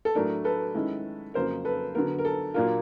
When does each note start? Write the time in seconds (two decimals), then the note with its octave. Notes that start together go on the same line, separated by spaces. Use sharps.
0.05 A4
0.15 A2 F#3 A3 D4 A#4
0.44 A4 B4
0.75 D#3 G#3 C#4 E4
1.34 F2 C#3 F#3 A#3 A#4 C5
1.65 A4 B4
1.95 D3 F#3 B3 A#4
2.19 A#4
2.25 A4
2.54 A#2 F#3 A#3 D4 F4 A#4